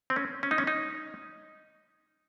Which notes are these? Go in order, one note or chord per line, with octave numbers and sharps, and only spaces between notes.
C4
C#4
C#4
D#4
C#4
D#4